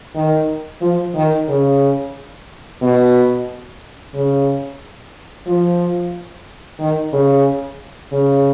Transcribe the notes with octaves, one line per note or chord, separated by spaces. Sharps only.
D#3
F3
D#3
C#3
B2
C#3
F3
D#3
C#3
C#3